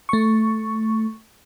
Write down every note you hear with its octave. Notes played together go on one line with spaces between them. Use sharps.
A3 C#6